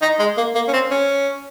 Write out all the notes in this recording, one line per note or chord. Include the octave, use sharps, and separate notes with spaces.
D#4
G#3
A#3
A#3
C#4
C4
C#4